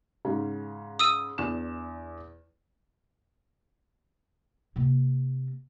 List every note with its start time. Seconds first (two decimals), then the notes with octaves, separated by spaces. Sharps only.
0.25 G#2 C#3
0.99 D#6 E6 D#7
1.38 E2 D4 E7
4.76 C3 A#3